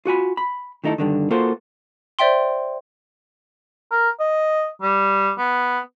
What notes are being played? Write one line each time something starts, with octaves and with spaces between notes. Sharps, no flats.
F4 F#4 G#5 B5
B5
D#3 A3 D#4 E4 A4
G2 D3 D#3
A#3 F4 F#4 A4 C5
C5 D5 E5 G5 C6
A#4
D#5
G3
B3